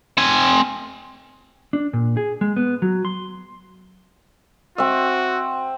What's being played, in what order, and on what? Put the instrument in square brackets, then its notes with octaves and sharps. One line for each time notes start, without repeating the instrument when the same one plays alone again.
[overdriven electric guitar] C4 G#5
[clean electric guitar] D4
A#2
G#4
G#3
B3
F#3
C6
[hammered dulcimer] C4 E5 [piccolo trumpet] F#4